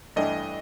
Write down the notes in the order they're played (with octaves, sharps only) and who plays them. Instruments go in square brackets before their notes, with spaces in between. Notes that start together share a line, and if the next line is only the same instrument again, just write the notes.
[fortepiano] G2 E3 A3 D4 [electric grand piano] D#5